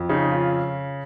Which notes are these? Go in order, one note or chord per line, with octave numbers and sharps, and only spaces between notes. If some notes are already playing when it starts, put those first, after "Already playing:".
Already playing: F2
C#3 D#4
F4